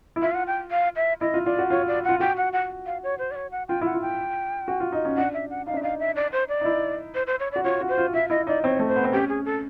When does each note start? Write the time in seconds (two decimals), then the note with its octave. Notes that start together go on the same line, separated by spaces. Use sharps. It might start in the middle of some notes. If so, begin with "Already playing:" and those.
0.16 E4
0.22 F4 E5
0.31 F5
0.35 F#5
0.47 G5
0.71 F5
0.96 E5
1.21 E4 D#5
1.34 F4
1.46 F4 D5
1.59 F#4
1.70 F4 C#5
1.88 D5
2.04 F4 F#5
2.20 F#4 G5
2.37 F#5
2.53 F#5
2.86 F5
3.03 C#5
3.19 C5
3.31 D5
3.36 C#5
3.52 F#5
3.68 F4 G5
3.81 E4 F#5
3.94 F4
4.01 G5
4.68 F#4
4.80 F4
4.92 D#4
5.05 C#4
5.17 D4 F#5
5.34 E5
5.50 F#5
5.66 D#4 F5
5.74 D4
5.77 E5
5.81 D#4 F5
6.00 E5
6.16 D5
6.33 C5
6.49 D5
6.61 D#4
6.65 E4
7.15 C5
7.27 C5
7.40 C#5
7.52 D5
7.56 F#4
7.64 F4 C#5
7.81 F#4
7.89 C5
7.98 F4
8.14 F4 E5
8.30 E4 D#5
8.47 D#4 D5
8.64 C4 C#5
8.79 A3
8.88 C5
8.96 B3
9.04 C4
9.12 C#4 G4
9.29 G#4
9.45 A4